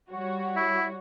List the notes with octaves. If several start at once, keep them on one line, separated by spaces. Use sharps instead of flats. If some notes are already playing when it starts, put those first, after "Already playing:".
G3 F#4 C#5
E4